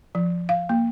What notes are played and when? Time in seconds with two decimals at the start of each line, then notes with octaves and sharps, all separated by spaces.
0.15 F3
0.49 F5
0.69 A#3